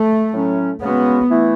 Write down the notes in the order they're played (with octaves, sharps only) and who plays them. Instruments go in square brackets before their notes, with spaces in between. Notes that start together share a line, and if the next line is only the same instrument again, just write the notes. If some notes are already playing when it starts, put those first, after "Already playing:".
Already playing: [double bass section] A3
[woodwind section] A2 F#3 C#4
[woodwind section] C#3 G#3 C#4 F#4 [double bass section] B3
[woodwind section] E3 A3 E4